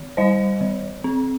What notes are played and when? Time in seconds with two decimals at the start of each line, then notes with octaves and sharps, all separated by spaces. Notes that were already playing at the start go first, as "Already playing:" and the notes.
Already playing: D#3
0.17 G3 C5 D#5
0.61 D#3
1.04 C4